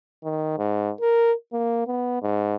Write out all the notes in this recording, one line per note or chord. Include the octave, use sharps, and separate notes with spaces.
D#3
G#2
A#4
A#3
B3
G#2